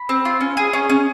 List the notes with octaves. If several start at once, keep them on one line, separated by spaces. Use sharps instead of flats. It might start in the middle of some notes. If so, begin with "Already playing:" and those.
Already playing: B5
C4
F4
C#4
G#4
C#4
C#4